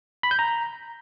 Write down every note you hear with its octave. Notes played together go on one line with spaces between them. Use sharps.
B5
G6
A#5